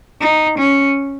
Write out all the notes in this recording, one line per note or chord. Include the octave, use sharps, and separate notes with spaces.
D#4
C#4